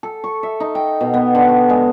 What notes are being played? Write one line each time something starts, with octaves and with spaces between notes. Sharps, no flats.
A4
C#6
E5
D#4
G5
B2
B3
D3
F#4
G#3